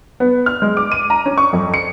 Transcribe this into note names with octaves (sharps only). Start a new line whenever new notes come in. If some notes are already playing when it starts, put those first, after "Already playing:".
B3
F6
G#3
D6
D#7
A#5
C#4
C#6
F2
C#7